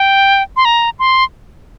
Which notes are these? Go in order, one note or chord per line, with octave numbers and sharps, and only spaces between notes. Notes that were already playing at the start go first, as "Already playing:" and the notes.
Already playing: G5
C6
A#5
C6